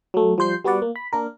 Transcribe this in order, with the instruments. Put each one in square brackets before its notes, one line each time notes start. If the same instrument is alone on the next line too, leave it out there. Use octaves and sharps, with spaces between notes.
[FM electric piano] F#3 A3
F3 G3 C5 G6 C7
G3 B3 F#4 B4 D5 F#5
A#3
B5
A#3 D4 A#4